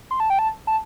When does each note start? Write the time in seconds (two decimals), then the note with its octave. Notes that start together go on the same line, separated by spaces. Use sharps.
0.11 C6
0.20 A5
0.30 G5
0.39 A5
0.67 A5